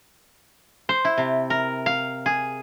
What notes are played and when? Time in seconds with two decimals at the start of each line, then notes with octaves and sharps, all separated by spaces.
0.89 C5
1.05 E4
1.18 C3
1.50 A#4
1.86 F5
2.26 G#4